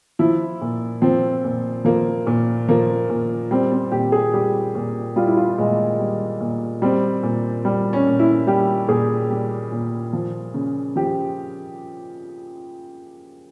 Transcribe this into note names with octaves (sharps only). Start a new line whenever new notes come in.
F3 E4
A#2
F3 C4
A#2
F3 A#3
A#2
F3 A#3
A#2
G3 C4
C4
A#2 G4
G#4
G3 G4
A#2
G3 F4
E4
F4
A#2 G#3
G3
A#2
G3 C4
A#2
G3
C#4
A#2
E4
G3 G4
A#2 G#4
G3
A#2
F3
C#3
F3 G4